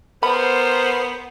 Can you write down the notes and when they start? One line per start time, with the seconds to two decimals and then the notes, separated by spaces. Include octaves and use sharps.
0.23 B3 A#4 C5 B5